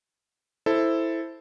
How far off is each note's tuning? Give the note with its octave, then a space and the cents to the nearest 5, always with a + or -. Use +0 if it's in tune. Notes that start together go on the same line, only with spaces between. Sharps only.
E4 +0 A4 +0 C5 +0